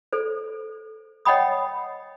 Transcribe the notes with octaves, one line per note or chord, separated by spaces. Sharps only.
A4 C5
C#5 D#5 F#5 G5 B5 D#6